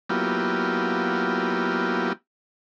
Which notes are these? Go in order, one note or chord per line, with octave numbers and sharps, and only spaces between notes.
F#3 A#3 B3 E4 F4 G4